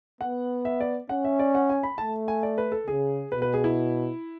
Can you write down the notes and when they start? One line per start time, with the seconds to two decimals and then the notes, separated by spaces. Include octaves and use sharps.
0.21 B3 F#5
0.65 E5
0.80 D5
1.09 C#4 F#5
1.25 E5
1.39 D5
1.55 F#5
1.69 G#5
1.83 B5
1.98 A3 A5
2.28 G#5
2.43 D5
2.58 B4
2.72 A4
2.87 C#3 G#4
3.32 B2 B4
3.42 B4
3.54 G#4
3.64 E4